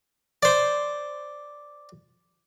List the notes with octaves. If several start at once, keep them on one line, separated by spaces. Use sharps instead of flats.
C5 D5